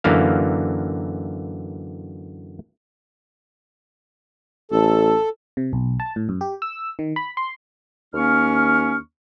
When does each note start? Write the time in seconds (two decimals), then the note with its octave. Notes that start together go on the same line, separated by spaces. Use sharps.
0.04 F#2 D3 E3 A#3 F5
4.71 A1 A4
5.57 C3
5.73 B1
6.00 A5
6.16 A2
6.29 F#2
6.41 G4
6.62 E6
6.99 D#3
7.16 B5
7.37 C6
8.14 D#2 A#3 C#4 C#6 F6